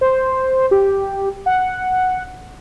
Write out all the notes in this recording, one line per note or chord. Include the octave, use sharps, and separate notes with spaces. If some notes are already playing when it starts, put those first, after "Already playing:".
C5
G4
F#5